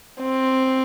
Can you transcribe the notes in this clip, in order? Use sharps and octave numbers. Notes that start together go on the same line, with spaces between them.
C4